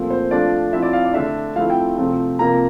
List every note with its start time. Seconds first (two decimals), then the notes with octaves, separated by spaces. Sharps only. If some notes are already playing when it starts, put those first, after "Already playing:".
Already playing: A#2 F3 A3 C4
0.10 C5
0.31 F3 A3 D4 F4 D5
0.72 F3 C4 E4 E5
0.82 D5
0.93 F5
1.04 D5
1.14 D3 A3 D4 E5
1.55 F3 A3 C4 E4 F5
1.70 G5
1.97 C3 F3 A3 C4
2.39 C3 F3 A#3 A#5